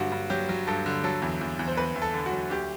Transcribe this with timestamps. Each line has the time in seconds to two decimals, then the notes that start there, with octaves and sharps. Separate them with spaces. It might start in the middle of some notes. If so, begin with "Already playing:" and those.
Already playing: G2 D3 F#3 F#4
0.12 G2
0.30 F#3 G4
0.49 F#3
0.67 G2 A4
0.86 D3
1.04 F#3 A4
1.22 E2
1.41 E2
1.59 E2
1.68 C5
1.77 E2 B4
1.96 E2
2.02 A4
2.14 D3
2.26 F#4
2.32 F#3
2.50 D2 G4